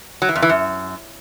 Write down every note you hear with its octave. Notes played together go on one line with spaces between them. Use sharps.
F#3
E3
F2
E3
F#2